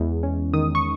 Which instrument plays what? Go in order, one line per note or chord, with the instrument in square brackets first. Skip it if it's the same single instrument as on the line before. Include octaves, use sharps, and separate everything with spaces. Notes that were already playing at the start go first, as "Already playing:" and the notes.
Already playing: [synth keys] E2 G#3
C#4
D#3 D#6
C#6